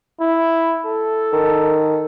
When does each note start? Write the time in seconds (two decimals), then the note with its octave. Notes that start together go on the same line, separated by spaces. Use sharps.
0.20 E4
0.85 A4
1.32 D#3